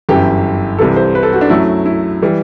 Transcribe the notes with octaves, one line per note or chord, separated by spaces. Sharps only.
G1 F#2 E3 G4
C2 C3 E3 A4
C5
B4
A4
F#4
D4
F#2 F#3 A3 E4
E4
E3 G3